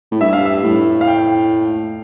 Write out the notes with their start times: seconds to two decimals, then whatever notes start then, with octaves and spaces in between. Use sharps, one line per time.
0.12 A2
0.21 G2 E5
0.33 F5
0.45 E5
0.64 A2
1.01 F5
1.07 G5